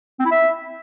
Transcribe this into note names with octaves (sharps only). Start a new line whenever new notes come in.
C4
E4
E5